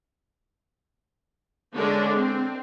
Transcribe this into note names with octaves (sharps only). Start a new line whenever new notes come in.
D3 G#3 C#4 D4
C4